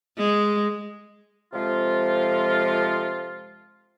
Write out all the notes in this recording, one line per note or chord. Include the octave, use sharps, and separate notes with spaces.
G#3
F2 C3 F3 G#3 F4